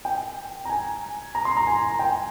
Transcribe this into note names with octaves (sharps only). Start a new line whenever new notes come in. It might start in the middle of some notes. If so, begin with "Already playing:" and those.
G5
A#5
G#5
A#5
C6
A#5
G#5
G5